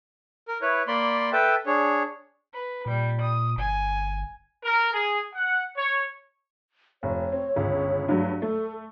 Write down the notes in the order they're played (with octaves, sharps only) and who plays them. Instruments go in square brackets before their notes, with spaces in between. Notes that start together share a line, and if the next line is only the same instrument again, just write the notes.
[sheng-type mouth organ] A#4
E4 B4 C#5
A#3 D5 B5 C6
A4 B4 E5 G5 A5
D4 G#4 C#5
[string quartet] B4
[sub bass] A#2 [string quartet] G3
[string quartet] D#6
[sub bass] G1 [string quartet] G#5
[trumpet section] A#4
G#4
F#5
C#5
[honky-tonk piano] F1 [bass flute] C#5
[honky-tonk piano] C4
G1 C#2
G2 F#3 A3
[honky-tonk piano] A3 [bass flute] A4